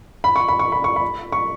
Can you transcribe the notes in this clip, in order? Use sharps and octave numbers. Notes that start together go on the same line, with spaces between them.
B5
C#6
B5
C#6
B5
C#6
B5
C#6